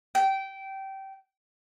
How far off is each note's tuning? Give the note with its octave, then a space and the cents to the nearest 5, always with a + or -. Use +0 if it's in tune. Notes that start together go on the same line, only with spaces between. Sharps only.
G5 -20